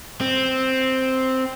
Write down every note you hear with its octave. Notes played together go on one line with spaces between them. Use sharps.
C4